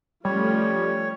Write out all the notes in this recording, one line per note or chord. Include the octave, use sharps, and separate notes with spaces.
F3 G3 A3 C#4 C#5